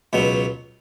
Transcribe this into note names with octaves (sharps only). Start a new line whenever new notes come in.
C#2 B2 F#3